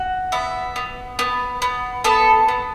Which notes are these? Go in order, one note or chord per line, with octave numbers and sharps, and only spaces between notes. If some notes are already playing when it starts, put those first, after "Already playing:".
Already playing: F#4
B3 E5
B3
B3
B3
B3 A4
B3